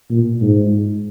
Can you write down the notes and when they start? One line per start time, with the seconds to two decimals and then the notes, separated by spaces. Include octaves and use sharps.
0.11 A#2
0.42 G#2